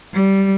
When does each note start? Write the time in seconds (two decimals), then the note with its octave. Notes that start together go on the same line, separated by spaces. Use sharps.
0.13 G3